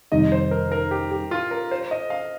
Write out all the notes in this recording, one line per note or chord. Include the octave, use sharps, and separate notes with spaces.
F2 C3 D#3 G3 D#4 D#5
C5
A#4
A#4
G4
G4
F4
A#4
C5
D#5
F5